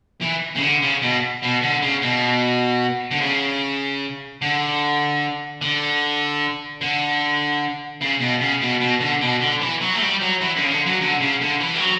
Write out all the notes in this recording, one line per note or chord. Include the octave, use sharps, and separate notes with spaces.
E3
C#3
D3
C#3
B2
B2
D3
C#3
B2
D3
C#3
D3
D3
D3
C#3
B2
C#3
B2
B2
D3
B2
D3
E3
F#3
A3
G3
F#3
E3
D3
C#3
D3
F#3
D3
C#3
D3
E3
G3
F#3